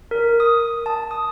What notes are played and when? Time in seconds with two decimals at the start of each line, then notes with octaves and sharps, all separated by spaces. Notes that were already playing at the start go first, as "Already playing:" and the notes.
0.11 A#4
0.40 D#6
0.86 A5
1.11 D#6